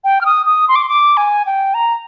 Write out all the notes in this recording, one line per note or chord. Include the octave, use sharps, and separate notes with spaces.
G5
F6
D#6
D#6
C6
D6
C6
D6
G#5
G5
A#5